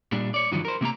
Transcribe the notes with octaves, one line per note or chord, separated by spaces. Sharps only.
A#2 G3 D4
C#5 D5
G2 D3 D#3 F3 F#3
A#4 C5
C3 A#3 C4 A#5